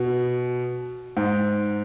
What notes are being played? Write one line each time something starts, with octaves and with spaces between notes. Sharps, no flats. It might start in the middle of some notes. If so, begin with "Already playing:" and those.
Already playing: B2
G#2